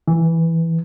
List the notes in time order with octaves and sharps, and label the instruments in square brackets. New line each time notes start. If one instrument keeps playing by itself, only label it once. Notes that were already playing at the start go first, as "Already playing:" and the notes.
[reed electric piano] E3